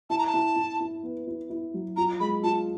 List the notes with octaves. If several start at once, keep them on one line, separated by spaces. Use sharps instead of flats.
E4 A5
A#5
A5
E4
E4
E4
B3
E4
E4
F#3
F4 A#5
G#3 B5
F4 A5